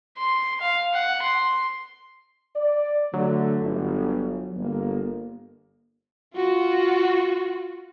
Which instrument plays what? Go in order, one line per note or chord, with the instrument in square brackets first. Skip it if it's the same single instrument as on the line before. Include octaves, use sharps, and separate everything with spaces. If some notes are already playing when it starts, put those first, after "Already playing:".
[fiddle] C6
F5
F#5
C6
[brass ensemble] D5
[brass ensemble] D3 A3 [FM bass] F#3
[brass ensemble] G1
G1 A#3
[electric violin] F4 F#4